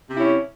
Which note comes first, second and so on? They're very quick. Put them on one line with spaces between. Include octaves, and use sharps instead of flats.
C3 E4 C#4